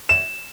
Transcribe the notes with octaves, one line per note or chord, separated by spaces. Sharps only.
E7